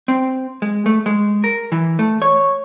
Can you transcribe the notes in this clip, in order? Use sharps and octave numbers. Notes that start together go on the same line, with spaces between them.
C4
G#3
A3
G#3
A#4
E3
A3
C#5